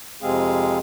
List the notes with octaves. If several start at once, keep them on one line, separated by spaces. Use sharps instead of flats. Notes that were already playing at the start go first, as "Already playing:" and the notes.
F2 C3 G#3 C4 G#4 F5